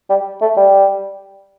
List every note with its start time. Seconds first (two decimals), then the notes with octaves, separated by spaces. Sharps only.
0.09 G3
0.42 A3
0.57 G3